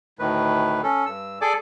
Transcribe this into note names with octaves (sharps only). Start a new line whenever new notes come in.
D2 A2 D#3 B4
C#4 A4
G2 E6
G#4 A4 D5 G#5 D6